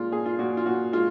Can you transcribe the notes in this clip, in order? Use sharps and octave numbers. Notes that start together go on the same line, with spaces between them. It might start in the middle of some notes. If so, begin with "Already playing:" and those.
Already playing: A#2 G#3 F4
A#2 G#4
F4
A#2 F#4
F4
A#2 F#4
G#3 F4